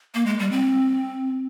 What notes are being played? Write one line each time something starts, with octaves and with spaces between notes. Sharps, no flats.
A#3
G#3
G3
C4